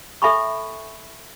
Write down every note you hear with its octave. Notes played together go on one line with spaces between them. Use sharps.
A4 E5 G#5 B5 C#6